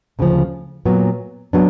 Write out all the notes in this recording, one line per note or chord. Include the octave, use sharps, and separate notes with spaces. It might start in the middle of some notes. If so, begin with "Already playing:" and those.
D2 C#3 F3
A#2 F#3 B3
F#3 B3 D4